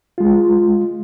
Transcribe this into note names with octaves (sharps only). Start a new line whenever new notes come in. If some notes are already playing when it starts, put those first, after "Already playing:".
G#3 F4